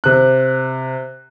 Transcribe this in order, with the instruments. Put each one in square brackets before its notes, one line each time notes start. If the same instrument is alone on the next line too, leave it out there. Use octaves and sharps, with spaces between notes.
[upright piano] C3 F#6